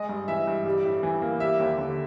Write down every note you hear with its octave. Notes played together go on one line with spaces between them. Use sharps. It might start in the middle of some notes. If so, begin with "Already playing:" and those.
Already playing: G#3 D#5
G2
E3 E5
G2
G3
A2
E3
A#3
G3 E5
D#2
D3